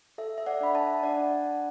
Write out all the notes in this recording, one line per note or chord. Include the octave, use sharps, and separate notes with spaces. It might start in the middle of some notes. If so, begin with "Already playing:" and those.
A4 E5
E5
D5 F#5
D4 B5
E5 A5
D4 D5 F#5
D4